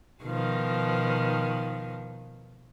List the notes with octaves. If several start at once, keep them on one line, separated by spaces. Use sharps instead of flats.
B2 D#3 F3